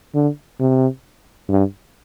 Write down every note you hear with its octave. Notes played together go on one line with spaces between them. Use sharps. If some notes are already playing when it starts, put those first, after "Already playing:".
D3
C3
G2